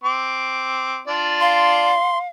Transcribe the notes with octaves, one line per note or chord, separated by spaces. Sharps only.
C4 D6
D4 F4 D5
F5 C6